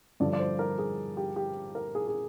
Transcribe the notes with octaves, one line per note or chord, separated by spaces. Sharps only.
G2 D3 F3 D5
D5
C5
A#4
G#4
G4
G4
A#4
G#4
G#4